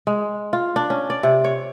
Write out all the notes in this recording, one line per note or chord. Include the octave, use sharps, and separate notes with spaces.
G#3
F4
D4
C#4
D5
C3
C#5